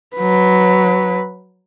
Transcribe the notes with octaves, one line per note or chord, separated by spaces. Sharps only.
F#3 B4